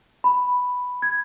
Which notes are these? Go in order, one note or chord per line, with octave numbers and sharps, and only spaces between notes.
B5
G#6